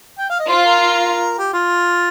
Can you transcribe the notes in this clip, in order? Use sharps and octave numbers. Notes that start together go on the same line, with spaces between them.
G5
F5
D#5
F4 C5
A#4
G4
F4